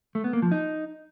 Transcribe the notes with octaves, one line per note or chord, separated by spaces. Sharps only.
A3
B3
A#3
F3
D#4